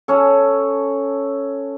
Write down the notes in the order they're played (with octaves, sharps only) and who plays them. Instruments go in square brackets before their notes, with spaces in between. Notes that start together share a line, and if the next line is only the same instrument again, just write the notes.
[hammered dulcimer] C#4 A4